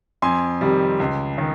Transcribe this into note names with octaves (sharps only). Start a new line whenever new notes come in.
F2 G#5 C6
C3 D#3 G3
C#2
D#3